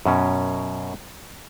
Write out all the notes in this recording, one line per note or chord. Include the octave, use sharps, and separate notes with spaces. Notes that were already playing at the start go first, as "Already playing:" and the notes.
F#2 B2 C#4